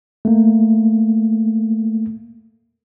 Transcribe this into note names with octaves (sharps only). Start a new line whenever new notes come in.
A3 A#3